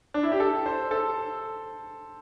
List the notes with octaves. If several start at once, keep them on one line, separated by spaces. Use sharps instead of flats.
D4
E4
G4
A4
C5
A4